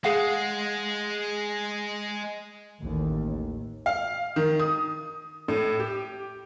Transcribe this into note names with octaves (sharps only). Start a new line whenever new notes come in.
G#3 G#4 F5 F#5
A1 D#2
F5
D#3
D#6
A2
G4